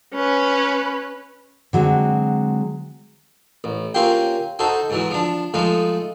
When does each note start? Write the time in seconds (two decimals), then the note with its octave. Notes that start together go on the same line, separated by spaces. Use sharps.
0.14 C#4 B4
1.73 D3 F#3 G#3 C4
3.64 A1
3.94 A#3 C4 C#4 F4 G4 G5
4.59 D#4 F#4 A4 C5
4.90 G#2 E3 F#3
5.11 F3 D4
5.54 F3 G#3 A3 D#4